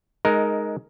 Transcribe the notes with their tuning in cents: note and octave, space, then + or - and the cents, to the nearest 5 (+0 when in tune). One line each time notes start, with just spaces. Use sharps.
G#3 +15 D#4 +0 A#4 +0